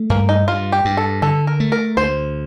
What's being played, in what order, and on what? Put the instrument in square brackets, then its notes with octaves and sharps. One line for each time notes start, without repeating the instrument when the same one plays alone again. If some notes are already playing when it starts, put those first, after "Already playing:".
Already playing: [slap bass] A3
[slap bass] G2 [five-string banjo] A#3
[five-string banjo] D#4
[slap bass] G2 [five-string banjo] F4
[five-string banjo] G4
[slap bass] G2
[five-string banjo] A4
[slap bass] D3 [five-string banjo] A4
[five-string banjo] A#4
[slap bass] A3
[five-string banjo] A#4
[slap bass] D2 [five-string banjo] C5